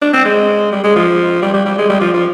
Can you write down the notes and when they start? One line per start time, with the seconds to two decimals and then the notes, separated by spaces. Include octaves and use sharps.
0.02 D4
0.13 C4
0.25 G#3
0.72 G3
0.83 G#3
0.96 F3
1.42 G3
1.54 G3
1.65 G3
1.78 G#3
1.89 G3
2.01 F3
2.13 F3